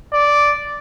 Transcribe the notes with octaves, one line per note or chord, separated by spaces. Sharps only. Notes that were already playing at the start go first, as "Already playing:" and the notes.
D5